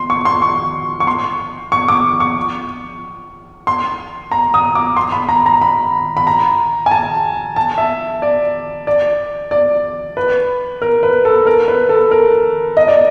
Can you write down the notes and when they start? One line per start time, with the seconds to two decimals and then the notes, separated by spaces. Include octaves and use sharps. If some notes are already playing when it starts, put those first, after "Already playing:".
Already playing: C6
0.10 C#6
0.25 C6
0.42 C#6
1.00 C#6
1.07 C6
1.72 C#6
1.88 D6
2.20 C#6
3.67 C6
4.32 A#5
4.54 D#6
4.75 D6
4.97 C6
5.12 B5
5.29 A#5
5.46 A#5
5.61 B5
6.17 B5
6.27 A#5
6.86 G#5
6.91 A5
7.56 A5
7.78 E5
8.22 D5
8.87 D5
9.51 D5
10.17 B4
10.82 A#4
11.03 B4
11.25 A4
11.47 A#4
11.68 B4
11.89 A4
12.11 A#4
12.77 D#5
12.88 D5